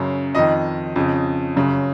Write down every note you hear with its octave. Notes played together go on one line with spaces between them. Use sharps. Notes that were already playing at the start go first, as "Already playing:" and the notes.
Already playing: F#2 C#3
F2 D#3 D#5
F2 C#3
F#2 C#3